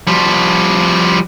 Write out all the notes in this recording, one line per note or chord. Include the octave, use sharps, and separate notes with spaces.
F3 G3